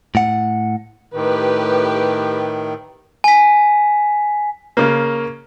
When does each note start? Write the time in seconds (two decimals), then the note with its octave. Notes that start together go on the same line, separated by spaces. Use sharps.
0.15 A2 F#5
1.14 A2 D#3 G4 B4
3.24 G#5 B6
4.77 C#3 A#3